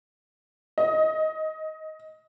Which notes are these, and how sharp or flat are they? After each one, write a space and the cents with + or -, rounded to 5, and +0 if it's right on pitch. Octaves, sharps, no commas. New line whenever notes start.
D#5 +15